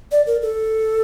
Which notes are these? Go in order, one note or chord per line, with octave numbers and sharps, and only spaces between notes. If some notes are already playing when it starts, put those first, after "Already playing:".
D5
A#4
A4